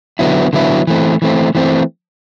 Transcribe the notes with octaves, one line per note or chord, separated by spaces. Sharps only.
D3 F#3 B3 E4
D3 F#3 B3 E4
E3 A3 C4
E3 A3 C4
E3 A3 C4